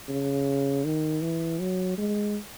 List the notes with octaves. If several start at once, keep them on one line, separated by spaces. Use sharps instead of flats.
C#3
D#3
E3
F#3
G#3